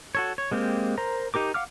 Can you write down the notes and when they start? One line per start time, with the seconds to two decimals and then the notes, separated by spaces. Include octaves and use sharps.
0.15 F#4 A4 C#5
0.38 C#5
0.51 G#3 A#3 C4 G4
0.98 A#4 C5 A#5
1.34 D#4 G4 A#4 D6
1.54 F5 F#5 D6 F6